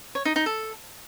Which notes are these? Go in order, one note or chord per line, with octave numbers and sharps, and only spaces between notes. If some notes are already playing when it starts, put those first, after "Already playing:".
C#5
D#4
D#4
A4